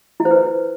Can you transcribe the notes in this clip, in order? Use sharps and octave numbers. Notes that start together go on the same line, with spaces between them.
E4
C5
B4